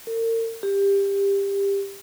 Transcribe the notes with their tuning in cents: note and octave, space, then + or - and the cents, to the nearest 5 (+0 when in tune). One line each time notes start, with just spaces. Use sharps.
A#4 -40
G4 +20